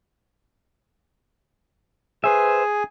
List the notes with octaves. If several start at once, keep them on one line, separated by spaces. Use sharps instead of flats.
G#4 B4 C5 E5 G#5